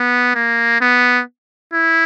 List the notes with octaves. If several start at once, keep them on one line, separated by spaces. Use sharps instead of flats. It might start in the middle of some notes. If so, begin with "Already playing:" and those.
Already playing: B3
A#3
B3
E4